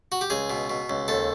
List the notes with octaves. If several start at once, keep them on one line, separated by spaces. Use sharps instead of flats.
F#4
G4
C#2 G#4
B2
B2
C#2
D#2 A4